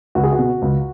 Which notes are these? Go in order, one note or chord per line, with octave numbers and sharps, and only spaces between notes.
C#2 F#4
G#4
F#4
B2
C#2